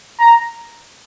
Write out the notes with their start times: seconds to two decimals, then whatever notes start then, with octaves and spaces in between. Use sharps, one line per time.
0.20 A#5